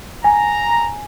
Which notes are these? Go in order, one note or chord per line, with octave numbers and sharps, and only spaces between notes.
G#5 A#5